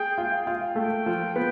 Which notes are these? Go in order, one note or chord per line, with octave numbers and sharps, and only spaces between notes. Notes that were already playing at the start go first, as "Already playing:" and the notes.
Already playing: G#4 G5
F4
F4
A3 G5
F3
B3